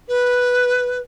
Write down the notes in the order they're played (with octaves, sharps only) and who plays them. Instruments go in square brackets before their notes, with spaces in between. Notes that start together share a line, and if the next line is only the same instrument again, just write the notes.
[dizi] B4